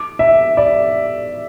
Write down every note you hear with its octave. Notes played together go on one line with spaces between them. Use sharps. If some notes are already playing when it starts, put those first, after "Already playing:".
Already playing: D6
E5
D5